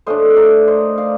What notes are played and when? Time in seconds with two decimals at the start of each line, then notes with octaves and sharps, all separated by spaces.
0.06 A2 A3 D4 C5 D#5
0.36 A#4 D5
0.67 C5 D#5
0.98 D5 F5